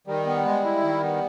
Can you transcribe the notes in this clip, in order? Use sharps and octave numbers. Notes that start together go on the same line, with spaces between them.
D#3 G3
B3
G#3
E4
D#3
B3